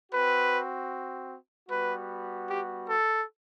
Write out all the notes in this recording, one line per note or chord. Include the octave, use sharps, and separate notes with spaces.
C4 F#4 B4
G3 B3 F#4 B4
G4
A4